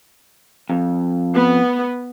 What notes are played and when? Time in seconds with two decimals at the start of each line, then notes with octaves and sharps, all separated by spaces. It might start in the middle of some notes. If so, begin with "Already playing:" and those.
0.70 F2
1.34 B3